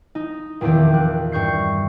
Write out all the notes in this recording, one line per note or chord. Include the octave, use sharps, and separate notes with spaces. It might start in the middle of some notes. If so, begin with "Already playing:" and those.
D#4
F1 E2 A#2 D#3 G4
F#6
G2 C#6 G6 C7